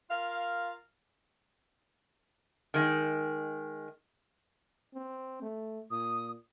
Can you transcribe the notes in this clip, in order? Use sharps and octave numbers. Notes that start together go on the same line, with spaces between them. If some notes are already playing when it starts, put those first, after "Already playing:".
F4 A#4 F5
D#3 G#3
C4
A3
A#2 D#6